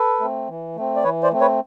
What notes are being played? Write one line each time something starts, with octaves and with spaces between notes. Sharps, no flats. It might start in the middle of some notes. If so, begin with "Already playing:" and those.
Already playing: A4 B4
A3 C4
E3
A3 C4
D5
E3 B4 C#5
C5 D5
A3 C4
B4 C#5